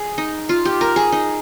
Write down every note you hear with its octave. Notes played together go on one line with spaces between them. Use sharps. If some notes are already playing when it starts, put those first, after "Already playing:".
Already playing: G#4
D#4
F4
G4
A#4
G#4
D#4